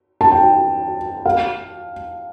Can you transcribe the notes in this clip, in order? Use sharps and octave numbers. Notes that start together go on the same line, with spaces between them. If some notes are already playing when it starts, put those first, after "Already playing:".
A5
G5
F5